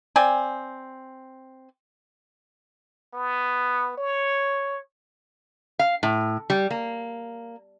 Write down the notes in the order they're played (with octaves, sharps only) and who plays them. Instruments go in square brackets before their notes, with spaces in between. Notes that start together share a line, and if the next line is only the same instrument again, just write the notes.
[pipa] C4 D5 G#5
[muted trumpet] B3
C#5
[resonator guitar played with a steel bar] F5
A2
G3
A#3